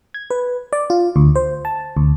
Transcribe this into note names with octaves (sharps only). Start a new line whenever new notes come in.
G#6
B4
D5
F4
D2
C5
A5
D2